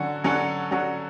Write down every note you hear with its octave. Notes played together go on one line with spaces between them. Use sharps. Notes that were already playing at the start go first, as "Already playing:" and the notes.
Already playing: D3 F#3 C#4 F#4 A4
D3 F#3 C#4 F#4 A4
D3 F#3 C#4 F#4 A4